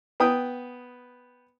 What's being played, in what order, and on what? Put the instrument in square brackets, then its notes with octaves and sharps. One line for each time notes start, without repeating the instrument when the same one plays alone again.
[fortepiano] B3 G5 D#6